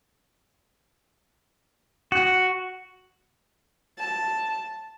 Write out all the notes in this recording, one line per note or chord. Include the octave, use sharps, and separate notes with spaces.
F#4
A5